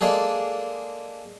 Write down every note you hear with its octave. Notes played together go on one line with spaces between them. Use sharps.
G#3 A#3 D4 G#4 A4